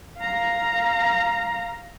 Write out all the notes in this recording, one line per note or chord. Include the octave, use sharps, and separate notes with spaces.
F5 A#5